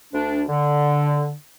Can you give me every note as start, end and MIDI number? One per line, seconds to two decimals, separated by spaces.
0.13 0.42 38
0.13 0.42 62
0.49 1.33 50